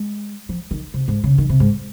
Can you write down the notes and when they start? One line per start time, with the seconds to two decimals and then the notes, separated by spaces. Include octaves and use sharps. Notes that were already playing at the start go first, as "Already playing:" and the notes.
Already playing: G#3
0.49 F3
0.71 D#3
0.94 C3
1.08 G#2
1.24 C#3
1.38 D#3
1.49 C3
1.60 G#2